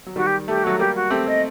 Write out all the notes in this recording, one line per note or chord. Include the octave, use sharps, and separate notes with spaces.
F#3
D#3 G3 F#4
G4
A3 G4
G3
F#3 A3 F#4
G3 A#3 G4
F#4
A3 C4 G4
D#5